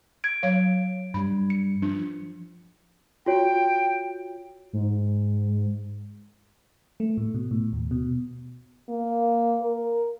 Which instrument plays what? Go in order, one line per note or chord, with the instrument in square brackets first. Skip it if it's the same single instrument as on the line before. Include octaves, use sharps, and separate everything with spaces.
[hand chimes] G#6 D7
[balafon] F#3 C#5 F5
[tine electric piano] G2 G3 [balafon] B5
[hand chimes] C#7
[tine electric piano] F3 [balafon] D4
[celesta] F4 F#4 C#5 [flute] G5
[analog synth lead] G#2
[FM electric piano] A3
A2
B2
A2
D#2
B2
[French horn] A#3
A#4